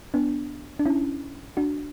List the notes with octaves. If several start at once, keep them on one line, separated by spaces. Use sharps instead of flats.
B3 D4
D4
C#4 E4
D4 F#4